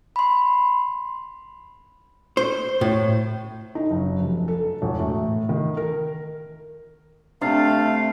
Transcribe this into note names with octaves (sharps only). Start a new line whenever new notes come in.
B5 C6
C5
A2
D#4
F#1
F1
A4
E1
A2
D#3
A#4
C3 A3 D4 F5 A6